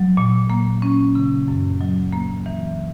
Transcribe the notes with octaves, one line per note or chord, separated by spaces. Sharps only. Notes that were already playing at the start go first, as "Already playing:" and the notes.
Already playing: F#3
A#2
A#3
C#4
C#3
F#2
F#3
A#3
E3